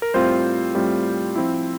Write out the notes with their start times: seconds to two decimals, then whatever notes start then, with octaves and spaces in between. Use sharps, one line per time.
0.02 A#4
0.14 A2 G3 C4 F4 C5
0.75 A2 G3 C4 F4
1.35 F3 C4 E4